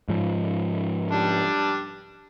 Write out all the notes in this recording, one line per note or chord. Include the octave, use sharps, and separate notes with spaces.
G#2 F3
G3 D4